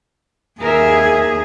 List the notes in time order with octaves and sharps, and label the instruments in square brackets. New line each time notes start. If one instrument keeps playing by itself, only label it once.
[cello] D#2 G#4 [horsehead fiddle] A#4 E5